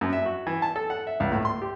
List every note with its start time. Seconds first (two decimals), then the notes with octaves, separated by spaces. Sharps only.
0.01 F#2
0.13 E5
0.26 F#4
0.47 E3
0.62 A5
0.76 A4
0.90 F#5
1.07 E5
1.20 C#2
1.32 A2
1.45 C6
1.62 G4